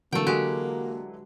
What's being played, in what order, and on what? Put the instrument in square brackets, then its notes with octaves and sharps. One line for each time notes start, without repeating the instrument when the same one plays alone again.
[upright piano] D3 E3 F#3 [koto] A3 G5 [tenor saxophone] A#3
[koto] G#3 G4 [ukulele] F#4